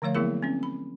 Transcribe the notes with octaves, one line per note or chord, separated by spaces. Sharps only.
D3 F3 A3 C#5 F5
F#3 A#3 B3 E4 G#4 A#4
C4 C#4
B5